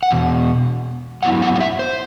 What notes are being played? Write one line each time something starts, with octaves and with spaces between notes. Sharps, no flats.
F#5
E2 B2
F#2 F#3 B3 E4 F#5
F#5
F#5
E5
C5